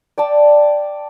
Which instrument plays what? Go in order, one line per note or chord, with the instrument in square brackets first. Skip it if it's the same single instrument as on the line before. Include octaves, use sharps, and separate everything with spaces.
[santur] D5 G5 A5